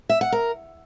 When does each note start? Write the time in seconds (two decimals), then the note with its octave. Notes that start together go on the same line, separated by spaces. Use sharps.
0.09 E5
0.21 F#5
0.32 A#4